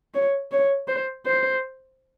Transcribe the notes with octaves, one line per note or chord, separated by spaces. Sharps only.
C#5
C#5
C5
C5